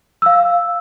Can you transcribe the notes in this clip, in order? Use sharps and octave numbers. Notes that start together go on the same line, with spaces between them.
F5 E6